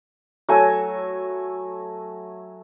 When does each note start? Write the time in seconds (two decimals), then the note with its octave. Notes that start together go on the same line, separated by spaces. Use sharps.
0.49 F#3 A3 G#5 E6